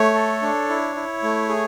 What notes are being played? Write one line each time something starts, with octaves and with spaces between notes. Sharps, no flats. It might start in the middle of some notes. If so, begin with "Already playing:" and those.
Already playing: A3 C#5
A4
D4
E4
E4
A3
G#4